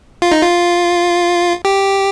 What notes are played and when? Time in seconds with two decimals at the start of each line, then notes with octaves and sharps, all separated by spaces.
0.22 F4
0.32 D#4
0.42 F4
1.65 G4